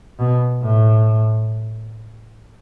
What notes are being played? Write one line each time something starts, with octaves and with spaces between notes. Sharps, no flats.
B2
A2